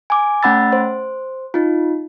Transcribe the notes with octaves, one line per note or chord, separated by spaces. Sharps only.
G#5 D6
A3 C#4 F#5 B5 E6 A6
C5
D#4 F4